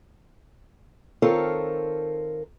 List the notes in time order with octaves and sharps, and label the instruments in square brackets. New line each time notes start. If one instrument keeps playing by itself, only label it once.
[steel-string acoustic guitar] D#3 C4 F4 A4 A#4 C#5